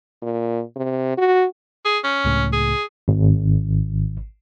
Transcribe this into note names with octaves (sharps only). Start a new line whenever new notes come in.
A#2
C3
F#4
G#4
C#4
C#2 A2
G#4
G#1